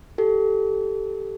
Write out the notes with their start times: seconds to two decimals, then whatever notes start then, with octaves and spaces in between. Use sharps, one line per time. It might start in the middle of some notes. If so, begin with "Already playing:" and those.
0.18 G4 A4